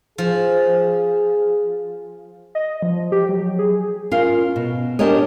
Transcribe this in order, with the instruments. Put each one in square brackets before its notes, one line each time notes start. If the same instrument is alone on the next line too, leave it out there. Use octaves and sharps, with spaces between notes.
[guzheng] F3 [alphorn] G#4
[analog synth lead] D#5
F3
G4
F#3
G#4
[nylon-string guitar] C#4 F4 A#4 F5
B2
C#4 D4 G4 A#4 C#5 D#5